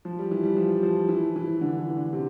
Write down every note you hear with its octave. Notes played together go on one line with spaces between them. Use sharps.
F3
G3
E3
G3
F3
F3
E3
E3
D3
E3
D3
C3